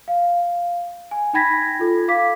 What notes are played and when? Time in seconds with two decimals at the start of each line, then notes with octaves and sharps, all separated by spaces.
0.08 F5
1.11 G#5
1.33 D#4 G5 B5 G#6 A#6 B6
1.79 F4 A4
2.08 F5 D6 B6